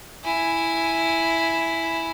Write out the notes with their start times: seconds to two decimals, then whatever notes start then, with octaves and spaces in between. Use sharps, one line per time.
0.24 E4 G#5